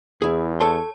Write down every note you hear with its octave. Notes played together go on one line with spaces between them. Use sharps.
E2 E4 G#4
A4 C#5 A5 C6